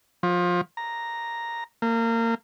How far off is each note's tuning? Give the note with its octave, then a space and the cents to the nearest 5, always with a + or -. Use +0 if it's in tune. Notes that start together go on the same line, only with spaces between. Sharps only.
F3 +25
A#5 +0
A#3 -25